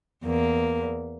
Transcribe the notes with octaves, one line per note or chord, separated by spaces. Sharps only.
E2 A#3